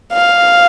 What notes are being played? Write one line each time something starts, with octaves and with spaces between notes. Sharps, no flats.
F5